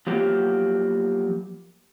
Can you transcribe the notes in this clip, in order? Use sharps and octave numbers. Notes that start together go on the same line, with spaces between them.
F3 F#3 A#3 B3 G4